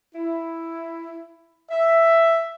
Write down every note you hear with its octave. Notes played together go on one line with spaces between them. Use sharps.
E4
E5